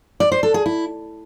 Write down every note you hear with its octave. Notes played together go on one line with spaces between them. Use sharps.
D5
C5
A4
G#4
E4